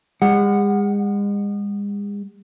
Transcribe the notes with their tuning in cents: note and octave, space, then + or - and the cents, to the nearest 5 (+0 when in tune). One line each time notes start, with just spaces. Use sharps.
G#3 -40 F#5 +0